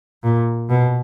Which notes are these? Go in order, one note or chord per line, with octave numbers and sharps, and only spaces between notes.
A#2
B2